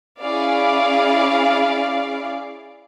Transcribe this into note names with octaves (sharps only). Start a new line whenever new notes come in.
C#4 E4 G#4 D5 F5